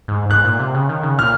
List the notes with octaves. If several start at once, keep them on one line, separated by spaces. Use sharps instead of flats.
G#2
G#2 F#6
A#2
C3
C#3
D#3
C#3
A#2 F6